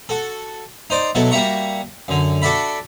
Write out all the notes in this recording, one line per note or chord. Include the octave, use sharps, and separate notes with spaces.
F#4 A4
D#4 C5 D5
B2 F#3 E4 F#4 A4
G3 A#3 F#4 E5 A#5 C#6
F#2 D3
D4 F#4 A4 D5 E5 B5